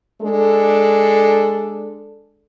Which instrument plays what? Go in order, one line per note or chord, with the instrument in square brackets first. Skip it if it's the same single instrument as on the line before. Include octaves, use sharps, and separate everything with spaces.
[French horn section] G#3 D4 A4